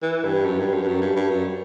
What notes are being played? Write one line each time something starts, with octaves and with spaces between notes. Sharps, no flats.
E3
G2
F#2
G2
F#2
G2
F#2
G2
G2
F#2